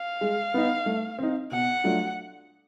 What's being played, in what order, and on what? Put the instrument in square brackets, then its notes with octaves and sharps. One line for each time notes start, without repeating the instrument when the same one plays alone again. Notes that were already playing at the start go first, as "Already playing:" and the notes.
Already playing: [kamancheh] F5
[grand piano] G#3
B3 D#4
A3
C4 D#4
[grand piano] B2 [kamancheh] F#5
[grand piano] F#3 A3 D4 F4